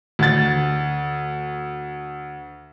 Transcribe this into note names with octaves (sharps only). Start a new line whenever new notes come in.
D2 A6